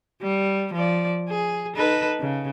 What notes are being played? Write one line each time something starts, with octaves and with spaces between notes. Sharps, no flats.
G3
F3 D5
G#4
D#4 A4 B4
C#3